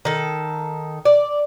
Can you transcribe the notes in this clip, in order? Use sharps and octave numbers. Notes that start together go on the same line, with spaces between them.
D#3 A4
D5